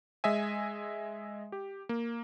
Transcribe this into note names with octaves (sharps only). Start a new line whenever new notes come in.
G#3 D#5 E5 G#5
G4
A#3